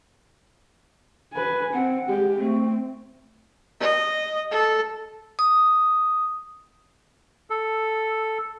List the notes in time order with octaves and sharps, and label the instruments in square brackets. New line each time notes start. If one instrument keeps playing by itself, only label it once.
[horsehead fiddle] B4 G#5
[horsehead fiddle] C4 [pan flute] F#5
[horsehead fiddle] G#3 G4
[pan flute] A3 [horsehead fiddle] C4
[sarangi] D#5
A4
[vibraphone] D#6
[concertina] A4